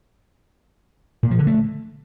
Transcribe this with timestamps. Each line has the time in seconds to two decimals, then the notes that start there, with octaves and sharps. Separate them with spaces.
1.23 A#2
1.31 F3
1.39 D3
1.47 A3